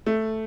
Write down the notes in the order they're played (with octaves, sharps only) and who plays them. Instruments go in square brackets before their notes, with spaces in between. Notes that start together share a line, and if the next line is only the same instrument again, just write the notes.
[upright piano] A3